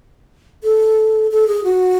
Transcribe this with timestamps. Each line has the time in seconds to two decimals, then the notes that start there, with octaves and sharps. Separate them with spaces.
0.64 A4
1.31 A4
1.47 G#4
1.64 F#4